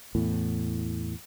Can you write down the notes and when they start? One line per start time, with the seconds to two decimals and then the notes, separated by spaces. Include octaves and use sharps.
0.15 E2 A2